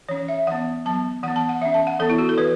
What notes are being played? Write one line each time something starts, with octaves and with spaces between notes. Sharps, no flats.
E3 C#4 C#5
E5
E3 B3 F#5
F#3 B3 A5
E3 B3 F#5
A5
F#5
E3 C#4 E5
A5
F#5
E3 B3 A4
E4
F#4
A4
E3 B4